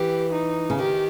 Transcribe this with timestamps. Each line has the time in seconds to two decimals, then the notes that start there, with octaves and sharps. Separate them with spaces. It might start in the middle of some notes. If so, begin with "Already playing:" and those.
Already playing: E3 G4
0.32 D#4
0.70 C#3
0.78 D#3 G4